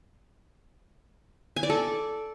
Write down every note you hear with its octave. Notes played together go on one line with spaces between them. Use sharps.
G#5
D5
A4